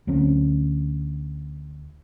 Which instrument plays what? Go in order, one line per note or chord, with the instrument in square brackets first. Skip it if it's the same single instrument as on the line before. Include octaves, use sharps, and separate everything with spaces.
[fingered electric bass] D2 F#3 C4 C#4